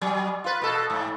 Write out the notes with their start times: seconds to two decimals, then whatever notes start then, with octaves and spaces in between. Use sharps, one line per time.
0.01 F#3
0.44 F4 B4
0.62 B2 A4
0.90 G#2